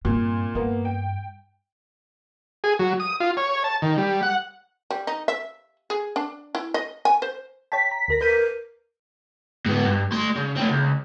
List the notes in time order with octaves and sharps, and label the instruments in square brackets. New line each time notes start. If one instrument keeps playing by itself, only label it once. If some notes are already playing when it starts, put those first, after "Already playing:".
[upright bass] G2 C4 [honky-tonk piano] A#2
[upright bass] G2 [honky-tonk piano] A#3 B3
[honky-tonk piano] G5
[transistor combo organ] G#4
F#3
D#6
F4
C#5
A5
D#3
G3
F#5
[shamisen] G3
D#4
E5
G#4
D4
E4
D#5
G#5
C5
[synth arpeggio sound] C#5 G5 A5 [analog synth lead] B6
[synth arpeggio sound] A#5
D2 A#4 A#6
[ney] A#4 [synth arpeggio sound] B4 G6 D#7
[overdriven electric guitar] G#2 B3
G2
A3 C6
C#3
A3 C4
C#2